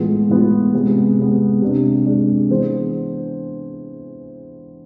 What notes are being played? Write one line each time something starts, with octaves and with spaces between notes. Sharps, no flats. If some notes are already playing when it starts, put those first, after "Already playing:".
Already playing: A2 E3 G#3 B3 F4
A2 E3 G#3 B3 F4
C3 G#3 B3
C3 G#3 B3
C3 G#3 D4
C3 G#3 D4
E3 B3 D4 G#4 C5